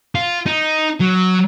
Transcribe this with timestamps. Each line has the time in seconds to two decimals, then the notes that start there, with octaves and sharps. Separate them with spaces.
0.15 F4
0.46 D#4
1.01 F#3